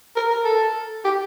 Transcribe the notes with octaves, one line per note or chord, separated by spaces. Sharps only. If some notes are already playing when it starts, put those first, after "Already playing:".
A#4
A#4
A4
G4